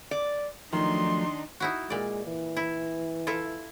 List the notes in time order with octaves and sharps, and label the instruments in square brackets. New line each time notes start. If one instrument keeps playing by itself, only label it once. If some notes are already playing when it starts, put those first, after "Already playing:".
[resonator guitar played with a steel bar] D5
[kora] D#3 [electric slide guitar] F3 F#3 A3 [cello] D4 D#4 [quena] C6
[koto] D#4 E4 F#4
[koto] A#2 D5 [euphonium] G#3
[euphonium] E3
[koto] E4
E4 F4 A4